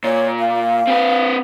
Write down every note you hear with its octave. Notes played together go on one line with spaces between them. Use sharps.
A#2 C#5
F5
C4 B4